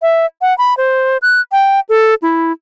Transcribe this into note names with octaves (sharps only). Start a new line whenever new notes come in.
E5
F#5
B5
C5
F#6
G5
A4
E4